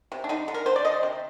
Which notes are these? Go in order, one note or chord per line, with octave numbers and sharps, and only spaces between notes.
C3
D4
D3 D#4
D3
A#4
D3 C5
D5
D3 D#5
C5
C3